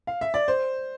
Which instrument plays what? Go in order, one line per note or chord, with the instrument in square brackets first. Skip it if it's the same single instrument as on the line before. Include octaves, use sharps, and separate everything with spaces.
[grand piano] F5
E5
D5
C5